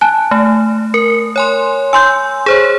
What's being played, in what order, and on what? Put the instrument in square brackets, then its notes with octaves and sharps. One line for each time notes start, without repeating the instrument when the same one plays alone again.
[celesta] G#5 A5 F#6
[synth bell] A3
[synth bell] A#4 [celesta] C#7
[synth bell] C#5 G#5 C6
[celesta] G#5 C6 G6 [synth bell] E6
[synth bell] G#4 C5 C#5